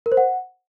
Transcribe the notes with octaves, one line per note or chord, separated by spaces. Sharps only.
A#4
C5
F#5